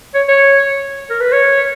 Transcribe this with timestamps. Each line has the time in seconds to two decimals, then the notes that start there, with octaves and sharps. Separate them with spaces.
0.14 C#5
0.28 C#5
1.10 A#4
1.20 B4
1.32 C#5